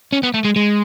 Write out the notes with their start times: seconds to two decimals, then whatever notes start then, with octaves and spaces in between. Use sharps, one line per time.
0.13 C#4
0.23 B3
0.34 A3
0.45 G#3
0.56 G#3